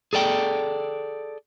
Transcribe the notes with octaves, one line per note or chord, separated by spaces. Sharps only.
G#4 A4 D5 G5